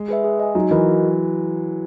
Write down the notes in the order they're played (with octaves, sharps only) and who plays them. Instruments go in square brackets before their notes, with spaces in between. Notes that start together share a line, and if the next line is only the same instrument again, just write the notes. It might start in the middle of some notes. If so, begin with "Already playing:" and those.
Already playing: [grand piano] G#3
[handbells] G#4 B4 E5
G#4
D#5 G#5
[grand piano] F#3 [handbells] D#4
[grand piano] E3 [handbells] F#4 A#4 D#5